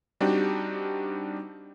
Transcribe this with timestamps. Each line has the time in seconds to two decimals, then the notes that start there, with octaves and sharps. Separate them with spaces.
0.21 G3 C4 D4 D#4 F#4 G4